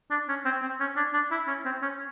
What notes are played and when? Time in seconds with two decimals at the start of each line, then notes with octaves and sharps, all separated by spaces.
0.10 D4
0.29 C#4
0.45 C4
0.62 C4
0.80 C#4
0.96 D4
1.14 D4
1.31 E4
1.48 C#4
1.65 C4
1.82 C#4